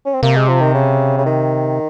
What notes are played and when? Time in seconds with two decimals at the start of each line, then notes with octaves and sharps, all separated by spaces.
0.06 C#4
0.14 C4
0.23 C3 A#3
0.36 G#3
0.48 F3
0.61 D#3
0.74 C#3
1.18 C#3
1.26 D#3